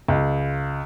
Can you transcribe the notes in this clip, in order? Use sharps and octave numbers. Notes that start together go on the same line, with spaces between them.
C#2